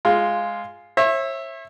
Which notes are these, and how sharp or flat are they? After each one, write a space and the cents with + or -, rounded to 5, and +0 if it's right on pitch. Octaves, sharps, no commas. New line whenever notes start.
G#3 +0 F4 +0
C#5 -40 E5 +0